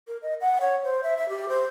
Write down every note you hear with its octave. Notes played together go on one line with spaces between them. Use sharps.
A#4
D#5
F#5
C#5
C5
E5
E5
G4
C5